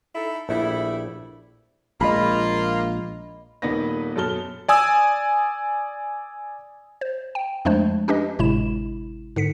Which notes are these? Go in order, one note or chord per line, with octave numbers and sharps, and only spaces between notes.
D#4 E4 A4
A#1 G3 A3 E4
A#1 G#3 A#3 F4 D#5 B5
D#1 A#3 B3 D#4 B4 A#6
F#2 B2 A4 A5 F6 G7
D5 G#5 D#6 E6
C5
G5
F2 F3 G#3 A3 D4 C5
C#4 D4 G4 B4 D#5
G#1 A2 C3 G#3 E4 E7
G#2 D3 B6 C#7